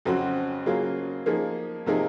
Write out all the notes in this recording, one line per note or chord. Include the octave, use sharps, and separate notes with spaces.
F2 C#3 F#3 C4 F#4
C#3 F#3 A#3 F4 G#4
F3 A#3 D#4 G#4
C3 F3 A#3 D#4 G#4